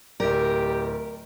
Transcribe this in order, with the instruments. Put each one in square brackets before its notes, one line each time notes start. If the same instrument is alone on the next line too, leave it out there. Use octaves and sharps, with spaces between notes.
[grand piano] D1 D5 [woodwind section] G4 [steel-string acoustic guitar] A#4